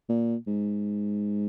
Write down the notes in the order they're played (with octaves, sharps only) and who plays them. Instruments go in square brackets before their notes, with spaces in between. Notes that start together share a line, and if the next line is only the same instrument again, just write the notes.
[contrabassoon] A#2
G#2